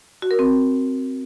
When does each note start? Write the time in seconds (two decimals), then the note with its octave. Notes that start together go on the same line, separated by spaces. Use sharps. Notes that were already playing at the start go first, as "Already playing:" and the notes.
0.22 F#4
0.31 A#4
0.39 C4